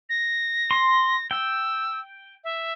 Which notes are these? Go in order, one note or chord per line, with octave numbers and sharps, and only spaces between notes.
A#6
C6
G5 E6
E5